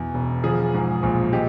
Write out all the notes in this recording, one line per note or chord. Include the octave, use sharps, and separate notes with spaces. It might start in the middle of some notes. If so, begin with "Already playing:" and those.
Already playing: E2 B2
E1
F3 G#4
G#2
A#1
G#3 G4